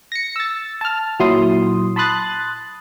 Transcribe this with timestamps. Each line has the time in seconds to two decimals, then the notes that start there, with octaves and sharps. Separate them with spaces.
0.12 A#6 C#7
0.36 E6 A6
0.81 A5 F6
1.20 A#2 F#3 E4 C6 D#6
1.96 A5 B5 C6 D#6 F#6 A6